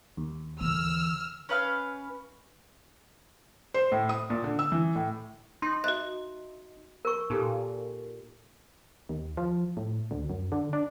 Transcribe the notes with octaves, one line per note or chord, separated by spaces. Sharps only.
D#2
D3 E3 E6 F6
C#4 B4 F5 F6
C5
A2
D#6
A#2
D3
E6
E3
A2
D#4 C6
F#4 D#5 E5 F#6
A#4 C#6
A#2 D#4 G4 A4
D#2
F3
A2
D2
F#2
D3
D4